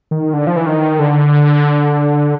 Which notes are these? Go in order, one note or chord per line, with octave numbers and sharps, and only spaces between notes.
D#3
D3
F3
E3
D#3
D3